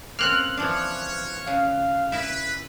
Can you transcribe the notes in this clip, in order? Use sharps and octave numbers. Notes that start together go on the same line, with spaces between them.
A#3 C4 C#4 F6 F#6
E3 F3 D4 C#5
C#3 F5
E4 B4 E5